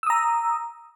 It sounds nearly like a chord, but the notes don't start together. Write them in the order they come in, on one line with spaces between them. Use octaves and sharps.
E6 D#6 A#5